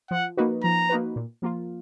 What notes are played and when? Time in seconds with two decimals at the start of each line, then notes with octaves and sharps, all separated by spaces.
0.11 F3 F#5
0.37 A#3 D#4 F#4 B4
0.63 F3 A#5
0.89 A#3 D#4 F#4 B4
1.16 A#2
1.42 F3 A#3 F4